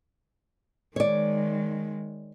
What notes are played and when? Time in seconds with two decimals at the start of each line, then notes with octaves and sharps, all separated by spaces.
0.96 D#3 G#3 C#5 D5